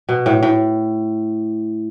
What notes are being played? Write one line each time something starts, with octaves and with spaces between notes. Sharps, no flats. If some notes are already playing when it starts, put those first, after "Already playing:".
B2
A2
A2